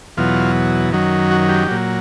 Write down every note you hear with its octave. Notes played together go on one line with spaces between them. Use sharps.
E2 B2 F#3 F4
F#2 D#3 F#3
F#4
G4
A#2 F#3